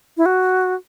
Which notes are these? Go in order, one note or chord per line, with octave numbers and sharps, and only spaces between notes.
E4
F#4